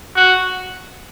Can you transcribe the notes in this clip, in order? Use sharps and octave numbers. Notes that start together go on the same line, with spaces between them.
F#4